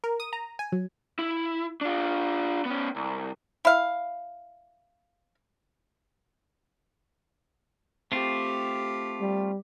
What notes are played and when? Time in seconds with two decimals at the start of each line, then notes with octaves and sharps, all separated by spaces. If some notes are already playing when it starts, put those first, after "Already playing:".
0.04 A#4
0.20 D#6
0.33 A#5
0.59 G#5
0.72 F#3
1.19 E4
1.81 D4 F4
2.65 B3 C#4
2.96 C2
3.65 E4 F5
8.12 A3 C4 F4 G4
9.20 G3